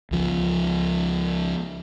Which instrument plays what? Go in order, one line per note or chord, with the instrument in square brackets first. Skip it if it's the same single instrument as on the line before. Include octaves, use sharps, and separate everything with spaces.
[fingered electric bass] C#2 F3